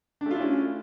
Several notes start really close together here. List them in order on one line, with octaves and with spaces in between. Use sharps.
D4 A3 F4 E4 C#4